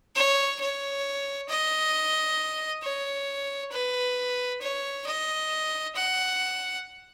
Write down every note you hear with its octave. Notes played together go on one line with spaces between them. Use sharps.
C#5
C#5
D#5
C#5
B4
C#5
D#5
F#5